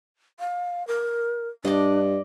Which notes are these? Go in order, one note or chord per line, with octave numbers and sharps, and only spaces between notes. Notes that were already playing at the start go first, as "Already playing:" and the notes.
F5
A#4
G2 D4 D5 D#5